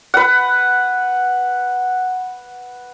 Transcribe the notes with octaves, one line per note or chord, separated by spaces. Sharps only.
B4 F#5